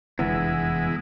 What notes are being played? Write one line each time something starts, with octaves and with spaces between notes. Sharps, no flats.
F1 E2 D3 G#3 B3 E4